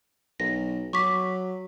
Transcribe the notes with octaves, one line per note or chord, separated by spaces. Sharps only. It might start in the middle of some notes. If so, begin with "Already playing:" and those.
B1 A#6
F#3 C#6 D6 B6